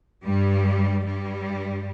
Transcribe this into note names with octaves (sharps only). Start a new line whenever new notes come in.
G2 G3
G2 G3